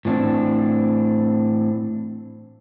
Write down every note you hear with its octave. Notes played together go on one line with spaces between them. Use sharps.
A2 E3 C4 D4